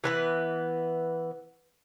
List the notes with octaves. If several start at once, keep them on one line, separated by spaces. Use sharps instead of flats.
E3 B3 B4